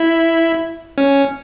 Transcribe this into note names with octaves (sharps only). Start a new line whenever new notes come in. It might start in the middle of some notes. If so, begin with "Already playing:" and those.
Already playing: E4
C#4